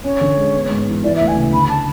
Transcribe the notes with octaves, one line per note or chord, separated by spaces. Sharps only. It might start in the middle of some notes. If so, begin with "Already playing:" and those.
C#4 C#5
D3
G#3
B3
G#2
E3
E3 D5
E5
D2
G#5
C#3
D3 B5
A5